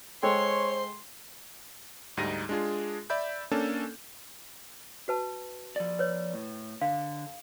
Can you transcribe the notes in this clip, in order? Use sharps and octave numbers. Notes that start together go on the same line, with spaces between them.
G#3 A4 C5 C#5 G5 C6
D2 G#2 G3 D#4 A#6 D#7
G#3 D4 F4 G#4
D5 E5 B5 G6
A#3 C#4 D4 A4
F#4 B4 A5
F3 D5
B4 C#5
A2
D3 F5